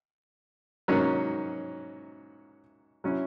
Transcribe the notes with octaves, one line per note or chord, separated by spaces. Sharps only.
G#2 F#3 A#3 C#4
F#3 C#4 E4